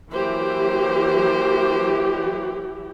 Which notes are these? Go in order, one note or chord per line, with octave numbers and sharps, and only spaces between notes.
E3 F#3 A#3 G4 C5